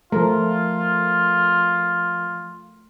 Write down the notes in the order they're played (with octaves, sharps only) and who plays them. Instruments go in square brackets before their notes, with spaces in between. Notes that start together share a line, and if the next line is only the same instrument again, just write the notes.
[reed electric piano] F3 A#4 [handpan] A3 [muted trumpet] F4